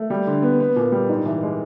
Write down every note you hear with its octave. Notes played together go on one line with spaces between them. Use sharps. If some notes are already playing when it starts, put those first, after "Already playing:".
Already playing: A3
G3
D3
B3
B3
A#2
G3
G#2
E3
G#3